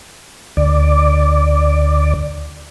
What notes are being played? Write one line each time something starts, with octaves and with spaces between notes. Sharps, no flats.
D2 D5